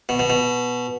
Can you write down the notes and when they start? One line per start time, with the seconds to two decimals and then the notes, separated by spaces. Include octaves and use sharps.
0.09 B2
0.19 B2
0.30 B2